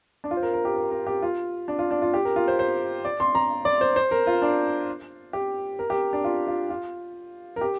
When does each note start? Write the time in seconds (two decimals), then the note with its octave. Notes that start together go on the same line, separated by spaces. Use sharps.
0.24 D4
0.31 F4
0.37 C5
0.43 A#4
0.54 A#4
0.65 G4
0.76 A#4
0.91 A#4
1.07 G4
1.22 F4
1.68 D4
1.79 F4
1.91 D4
2.02 F4
2.14 G4
2.25 A#4
2.36 F4
2.48 C5
2.59 C5
3.05 D5
3.20 C6
3.35 A#5
3.65 D5
3.81 C5
3.96 C5
4.11 A#4
4.27 F4
4.42 D4
5.33 G4
5.79 A#4
5.90 G4
6.13 D4
6.24 F4
6.47 F4
6.70 F4
7.56 A#4
7.61 G4